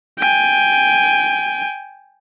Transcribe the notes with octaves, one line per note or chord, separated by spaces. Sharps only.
G5 G#5